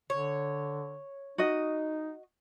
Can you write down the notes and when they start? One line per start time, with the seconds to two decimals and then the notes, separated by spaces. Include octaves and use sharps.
0.10 D3 C#5
1.38 D#4 F#4 D#5